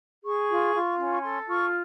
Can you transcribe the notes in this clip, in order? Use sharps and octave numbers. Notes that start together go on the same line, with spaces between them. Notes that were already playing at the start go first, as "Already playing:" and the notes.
G#4 C#6
F4
F4
C#4
C#6
A4 C6
F4 C#6